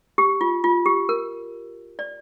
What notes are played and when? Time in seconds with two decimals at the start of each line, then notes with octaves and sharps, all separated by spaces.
0.18 G4
0.41 F4
0.64 F4
0.86 G4
1.09 A#4
1.99 D5